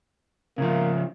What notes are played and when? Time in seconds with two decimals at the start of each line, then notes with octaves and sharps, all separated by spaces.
0.58 C#3 F3 A#3